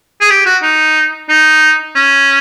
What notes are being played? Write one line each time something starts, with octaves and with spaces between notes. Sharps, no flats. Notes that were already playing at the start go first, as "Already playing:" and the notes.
G#4
G4
F#4
D#4
D#4
C#4